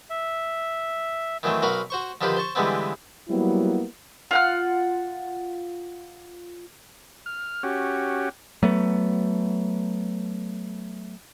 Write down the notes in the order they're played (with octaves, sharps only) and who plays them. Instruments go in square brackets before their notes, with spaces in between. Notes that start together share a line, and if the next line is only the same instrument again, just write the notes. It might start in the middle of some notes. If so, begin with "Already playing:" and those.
[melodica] E5
[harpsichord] D#3 E3 F#3 A3 C4
B1 F#4 A#4 B4 F5
F#4 C5 C#6
D3 D#3 F3 G4 B4 C5
C5 A5 C#6
D3 E3 G3 G#3 B3 C4
[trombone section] F#3 G3 A#3 B3 E4
[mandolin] F4 F#5 F6
[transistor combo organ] F6
C#4 F#4 G4
[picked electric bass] F#3 A3 B3